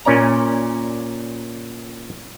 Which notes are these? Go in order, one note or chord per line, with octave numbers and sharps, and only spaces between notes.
A#2 C#4 D5 A#5